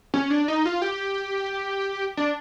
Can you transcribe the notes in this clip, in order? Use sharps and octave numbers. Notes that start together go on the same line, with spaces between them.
C#4
D4
D#4
F4
G4
D4